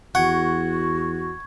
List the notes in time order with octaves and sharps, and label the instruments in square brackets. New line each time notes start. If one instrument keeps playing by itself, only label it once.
[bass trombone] E2 [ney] F#4 [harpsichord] F#5 [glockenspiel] C#6 G#6